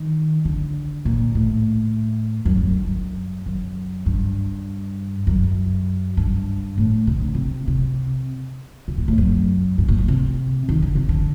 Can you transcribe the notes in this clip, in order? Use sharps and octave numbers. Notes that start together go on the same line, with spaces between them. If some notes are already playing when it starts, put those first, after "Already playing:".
Already playing: D#3
D3
A#2
A2
F#2
G2
G2
F#2
F#2
G2
F#2
G2
A2
C3
D3
C3
C3
C3
A#2
A2
F#2
G2
A#2
A2
C3
D#3
D3
C3
D3